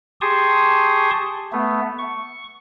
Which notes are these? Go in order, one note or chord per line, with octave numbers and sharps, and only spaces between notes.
G4 G#4 A5 C6 C#6 D#6
A3 B3
C#6